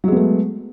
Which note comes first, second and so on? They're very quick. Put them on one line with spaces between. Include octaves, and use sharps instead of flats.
F#3 G#3 B3 A3